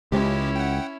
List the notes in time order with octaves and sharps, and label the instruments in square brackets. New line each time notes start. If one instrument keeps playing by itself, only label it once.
[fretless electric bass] C#2 [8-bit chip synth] C#3 G#3 G4 [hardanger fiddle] C#4 E4
[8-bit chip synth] F#5 G5